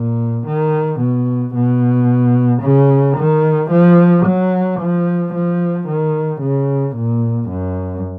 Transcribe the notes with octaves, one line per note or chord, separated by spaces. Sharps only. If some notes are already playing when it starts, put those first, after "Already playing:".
Already playing: A#2
D#3
B2
B2
C#3
D#3
F3
F#3
F3
F3
D#3
C#3
A#2
F#2